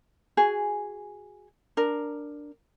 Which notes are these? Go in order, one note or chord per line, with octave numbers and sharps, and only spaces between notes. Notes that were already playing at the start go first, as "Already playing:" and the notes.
F#4 G#4 G#5
D4 A#4